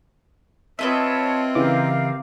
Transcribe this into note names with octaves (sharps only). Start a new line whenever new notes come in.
C4 F4 B4 C#5 D#5 E5 A5
C#3 E3 G4 A#4 F5 D6